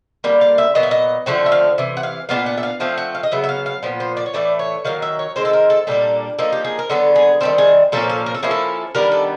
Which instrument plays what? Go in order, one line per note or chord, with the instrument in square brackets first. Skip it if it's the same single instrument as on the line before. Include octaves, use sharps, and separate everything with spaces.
[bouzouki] D3 G3 A#3
F5
E5
A#2 F#3 B3 D#5
E5
D#5
D3 F3 A3 C4 F#5
E5
F5
C3 E3
F#5
F5
A#2 G3 B3 D4 F5
F#5
E5
F5
F3 A3 C4 F5
F#5
F5
D#5
C#3 F#3 B3 E5
E5
F5
F5
A#2 F3 B3
C5
D5
C#5
A2 E3 A3 D5
C#5
D#3 F#3 A#3 F5
E5
C#5
D#3 G#3 C4 C5
A4
A#4
A4
A#2 G3 A#3 D4 A4
F3 A#3 D#4 A4
G4
G#4
A#4
D3 F#3 B3 A4
G#4
D#3 G3 C4 A4
G#4
A#2 F3 A#3 C#4 A4
A4
A#4
A4
F3 A#3 C#4 E4 G#4
A4
D#3 G3 B3 D4 A#4
A4